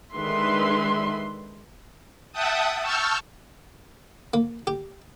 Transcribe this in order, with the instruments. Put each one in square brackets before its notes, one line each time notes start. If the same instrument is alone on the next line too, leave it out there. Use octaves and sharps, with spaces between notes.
[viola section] D3 D#3 G#3 B4 E5 C6
[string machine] E5 F#5 G5 A5 D#6
A5 C#6 E6 F6 G6
[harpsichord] A#3
G4